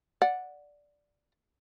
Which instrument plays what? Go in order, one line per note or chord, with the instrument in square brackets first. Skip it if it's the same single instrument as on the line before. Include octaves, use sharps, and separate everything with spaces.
[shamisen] D5 F#5